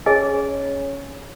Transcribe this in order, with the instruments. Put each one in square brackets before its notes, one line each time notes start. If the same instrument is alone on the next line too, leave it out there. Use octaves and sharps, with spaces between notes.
[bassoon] C#4 [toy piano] G#4 D#5 G#5
[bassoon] C#4